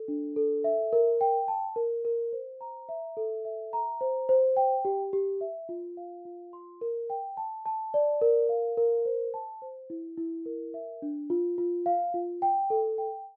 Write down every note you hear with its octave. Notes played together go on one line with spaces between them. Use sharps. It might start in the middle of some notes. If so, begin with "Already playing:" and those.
Already playing: A4
D4
A4
E5
A#4
G5
A5
A#4
A#4
C5
A#5
E5
A4
E5
A#5
C5
C5
G5
G4
G4
E5
F4
F5
F4
C6
A#4
G5
A5
A5
D5
A#4
F5
A#4
C5
A5
C5
E4
E4
A#4
E5
D4
F4
F4
F5
F4
G5
A4
G5